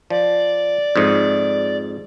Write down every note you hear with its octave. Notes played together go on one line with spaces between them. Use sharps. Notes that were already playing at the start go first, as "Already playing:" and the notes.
F3 D5
F2 G#2